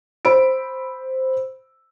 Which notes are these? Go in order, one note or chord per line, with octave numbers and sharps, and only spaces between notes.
C5 B5 E6 D7